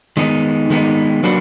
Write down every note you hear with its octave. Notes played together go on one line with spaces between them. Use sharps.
D#3 G#3 B3 D#4
D#3 G#3 B3 D#4
F#3 A#3 D4 F#4 B4